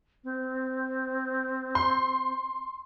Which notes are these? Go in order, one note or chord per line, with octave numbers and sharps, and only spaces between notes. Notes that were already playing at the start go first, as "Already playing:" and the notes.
C4
C6